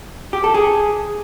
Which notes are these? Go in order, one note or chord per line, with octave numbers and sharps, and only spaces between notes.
G4
A4
G#4